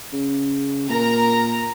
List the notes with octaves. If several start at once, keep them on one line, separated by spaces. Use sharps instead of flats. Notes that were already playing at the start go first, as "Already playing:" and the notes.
C#3
A#2 A#4 A#5